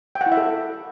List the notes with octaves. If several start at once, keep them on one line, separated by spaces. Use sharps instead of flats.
G5
F#5
E4
E5
A4